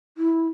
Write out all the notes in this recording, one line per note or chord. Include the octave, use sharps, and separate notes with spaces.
E4